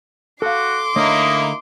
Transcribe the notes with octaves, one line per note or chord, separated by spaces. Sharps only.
F#4 A4 F5 C6 D6
D3 A3 A#3 D#4 E4 C#5 D#5